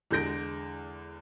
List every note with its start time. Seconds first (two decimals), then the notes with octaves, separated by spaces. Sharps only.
0.11 E2 D3 G#3 G6 A#6 D7